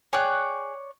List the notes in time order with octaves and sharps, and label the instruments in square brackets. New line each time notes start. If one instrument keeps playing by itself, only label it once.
[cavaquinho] G#4 G5 [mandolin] C#5 D5 F#6